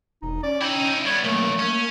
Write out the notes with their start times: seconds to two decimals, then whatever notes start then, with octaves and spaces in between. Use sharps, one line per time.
0.22 E1 D#4
0.43 C#4 D5
0.61 D#4 E4 G5
1.06 G3 B3 C#5
1.24 B1 F#2 A3 A#3
1.59 C#4